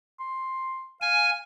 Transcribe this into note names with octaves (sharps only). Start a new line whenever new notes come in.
C6
F5 G#5